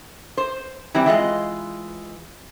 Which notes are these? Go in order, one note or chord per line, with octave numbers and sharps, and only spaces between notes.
C5
E3 G3 C4 E4 G4
E3 G#3 F4 D#5